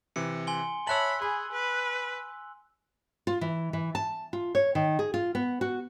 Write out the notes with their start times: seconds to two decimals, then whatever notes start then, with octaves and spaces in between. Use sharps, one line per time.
0.16 C3 E3 C#7
0.47 G#5 C6 G7
0.87 C#5 E5 A5 B5 E6 F#6 F#7
1.22 G#4 B5
1.52 B4
3.27 F4
3.41 E3
3.73 E3
3.95 A5
4.33 F4
4.55 C#5
4.75 D#3
4.99 G#4
5.14 F4
5.35 B3
5.61 F#4